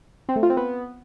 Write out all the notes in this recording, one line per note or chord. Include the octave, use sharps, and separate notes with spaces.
C4
A3
F4
C4
B3